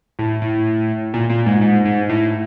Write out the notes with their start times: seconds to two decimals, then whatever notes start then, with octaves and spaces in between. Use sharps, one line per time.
0.19 A2
0.42 A2
1.14 A#2
1.30 A#2
1.46 G#2
1.61 G#2
1.85 G#2
2.09 A2